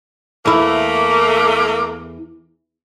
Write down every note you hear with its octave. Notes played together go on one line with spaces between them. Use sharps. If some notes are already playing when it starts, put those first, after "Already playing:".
E2 A3 A#3 E4